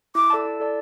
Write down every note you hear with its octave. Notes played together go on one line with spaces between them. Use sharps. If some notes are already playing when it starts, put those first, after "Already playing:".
E4 D6
A4 D5 A5
E4
A4 D5 A5